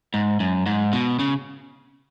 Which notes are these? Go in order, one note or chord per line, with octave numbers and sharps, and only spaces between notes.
G#2
F#2
G#2
B2
C#3